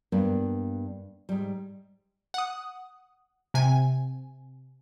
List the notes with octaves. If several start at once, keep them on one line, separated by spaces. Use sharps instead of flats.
G2 A#3 B3 D4
G#2 G3
F#5 D#6
C3 G#5